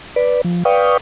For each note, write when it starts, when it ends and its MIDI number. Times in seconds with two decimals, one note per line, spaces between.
0.16 0.41 71
0.16 0.41 74
0.45 0.63 53
0.65 0.97 71
0.65 0.97 74
0.65 0.97 77
0.65 0.97 79
0.65 0.97 85
0.65 0.97 87